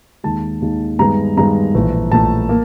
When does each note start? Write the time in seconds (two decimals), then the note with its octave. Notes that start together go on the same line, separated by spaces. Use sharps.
0.24 D#2 D#3 G#3 A5
0.62 D#2 D#3 G#3
0.99 G2 D#3 G#3 B3 A#5
1.37 G2 D#3 G#3 B3 A#5
1.74 A#1 A2 E3 A3
2.12 A#1 A2 E3 A3 A5
2.49 A#3